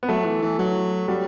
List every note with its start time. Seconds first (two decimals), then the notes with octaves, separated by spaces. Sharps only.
0.03 B3
0.08 F#3 A3
0.25 E3
0.42 E3
0.59 F#3
1.08 F#3 G3